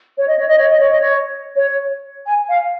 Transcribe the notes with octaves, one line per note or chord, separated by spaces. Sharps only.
C#5
D#5
C#5
D#5
C#5
D#5
C#5
D#5
C#5
C#5
G#5
F5